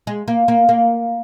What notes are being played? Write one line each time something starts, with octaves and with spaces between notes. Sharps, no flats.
G#3
A#3
A#3
A#3